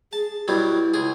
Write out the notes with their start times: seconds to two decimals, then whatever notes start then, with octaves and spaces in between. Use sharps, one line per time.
0.13 G#4 A5
0.48 G2 B2 F#3 E4
0.94 C#2 G#4